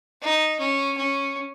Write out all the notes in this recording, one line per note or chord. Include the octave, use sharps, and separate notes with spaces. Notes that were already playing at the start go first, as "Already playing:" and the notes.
D#4
C#4
C#4